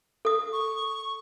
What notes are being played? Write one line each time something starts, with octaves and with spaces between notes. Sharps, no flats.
A4 D#6
C#6